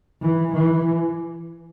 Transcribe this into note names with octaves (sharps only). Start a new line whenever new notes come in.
E3
E3